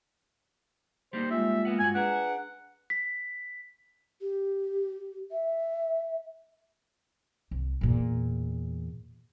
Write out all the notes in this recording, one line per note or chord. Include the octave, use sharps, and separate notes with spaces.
G3 A#3 D#4 C5
G#3 F4 E5
A#3 B3 F#5
G2 F#4 G#5
D4 G#4 B4 F#5 A#5
B6
G4
E5
C2
E2 A#2